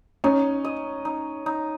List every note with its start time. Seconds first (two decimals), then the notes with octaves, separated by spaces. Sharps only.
0.24 C#4 D#4
0.64 D#5
1.05 D#4
1.46 D#4